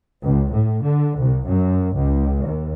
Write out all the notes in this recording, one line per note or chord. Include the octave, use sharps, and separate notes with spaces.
C#2
A2
D3
C2
F#2
C#2
D#2